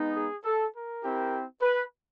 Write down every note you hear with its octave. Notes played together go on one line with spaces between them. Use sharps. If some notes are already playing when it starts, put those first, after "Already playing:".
Already playing: G#3 B3 D#4
G#4
A4
A#4
C4 E4 G4
B4